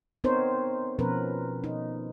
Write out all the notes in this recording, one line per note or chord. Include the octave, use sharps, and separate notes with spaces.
B3 C4 D#4 A#4 C5 C#5
B2 F3 B3 C#4 A#4 B4
D#4